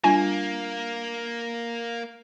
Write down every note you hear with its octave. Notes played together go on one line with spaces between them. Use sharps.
G3 A#3 D4 F4 G#5